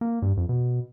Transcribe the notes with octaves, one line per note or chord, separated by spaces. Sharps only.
A#3
G2
F2
B2